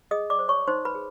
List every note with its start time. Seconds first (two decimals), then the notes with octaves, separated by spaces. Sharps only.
0.11 G#4 D#5 D#6
0.30 D5 D6
0.39 C5
0.48 C#5 C#6
0.67 D#4 C5 C6
0.85 B4 B5
0.95 G#4